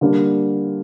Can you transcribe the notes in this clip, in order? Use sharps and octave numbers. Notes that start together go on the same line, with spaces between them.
D3 G3 A#3 D4